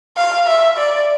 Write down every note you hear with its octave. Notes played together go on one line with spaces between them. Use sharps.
F5
E5
D5